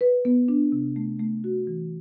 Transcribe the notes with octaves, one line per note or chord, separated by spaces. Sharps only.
B4
B3
D4
C3
A3
A3
F#4
E3